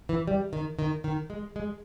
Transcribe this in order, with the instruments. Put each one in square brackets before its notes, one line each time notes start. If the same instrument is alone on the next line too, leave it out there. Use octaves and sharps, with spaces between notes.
[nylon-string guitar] E3
G3
D#3
D#3
D#3
G#3
G#3